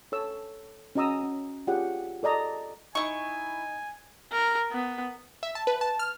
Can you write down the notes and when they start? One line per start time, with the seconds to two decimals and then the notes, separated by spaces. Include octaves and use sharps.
0.12 A4 C#5 E6
0.95 C#4 F#4 D#5 A#5 D#6 E6
1.23 C#4
1.67 F4 G4 G#4 C#5 F#5 G5
2.23 A4 D5 D#5 A#5
2.95 D#4 E4 G#5 C#6
4.32 A#4
4.72 B3
5.43 E5
5.55 A5
5.67 B4
5.81 A5
5.99 F6